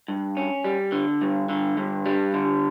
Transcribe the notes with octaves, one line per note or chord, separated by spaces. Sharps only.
G2
C#4
G3
D3
G2
D3
G2
G3
D3